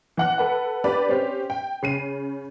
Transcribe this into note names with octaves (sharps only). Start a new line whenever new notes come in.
E3 F#5 F#6
A4 B4 F#5
D4 G4 B4 D5
C4 C#4 G4
G5
C#3 C7 D#7